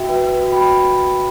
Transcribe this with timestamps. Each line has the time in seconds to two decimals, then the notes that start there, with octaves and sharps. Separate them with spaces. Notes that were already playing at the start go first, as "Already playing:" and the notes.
Already playing: F#4 E5 G5
0.09 B4
0.23 B4
0.37 F#4
0.52 F#4 G5 B5